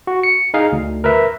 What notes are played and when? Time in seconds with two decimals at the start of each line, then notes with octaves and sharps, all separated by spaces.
0.07 F#4
0.23 C#7
0.54 D#4 G#4 F5
0.72 D2
1.04 A#4 B4 E5